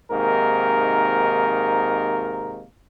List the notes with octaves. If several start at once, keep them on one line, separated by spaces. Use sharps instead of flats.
G#2 C3 D#3 A#3 A#4